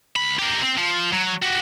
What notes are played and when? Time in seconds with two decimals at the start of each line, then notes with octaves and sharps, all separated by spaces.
0.16 C#2 B5
0.39 G4 A#4
0.62 C4
0.78 F3
1.13 F#3
1.43 F#4 G4